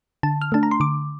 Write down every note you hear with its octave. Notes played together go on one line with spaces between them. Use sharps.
D3 A5
F6
A3 D4 A5
A#5
C6
D3 D6